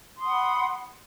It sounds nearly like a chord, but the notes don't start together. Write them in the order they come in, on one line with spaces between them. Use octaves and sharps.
C6 D#6 F#5 B5